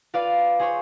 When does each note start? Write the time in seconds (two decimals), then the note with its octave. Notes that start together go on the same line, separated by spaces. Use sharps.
0.14 F4 B4 D5 F5
0.59 G#4 C5 C#5